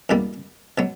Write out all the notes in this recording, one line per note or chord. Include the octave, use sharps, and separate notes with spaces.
E2 B2 G3 A#3
B2 F#3